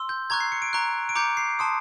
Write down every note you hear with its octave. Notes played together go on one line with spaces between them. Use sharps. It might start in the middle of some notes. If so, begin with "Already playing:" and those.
Already playing: C6 E6
G6
A#5 C#6 F#6 G#6
C7
C#7
D7
A#5 C#6 F#6
D7
A#5 D6 G6 C#7
C7
A5 C6 D#6